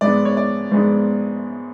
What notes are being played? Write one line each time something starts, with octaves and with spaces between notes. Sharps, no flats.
G#2 G#3 B3 D4 D5
C#5
D5
G#2 G#3 B3 D4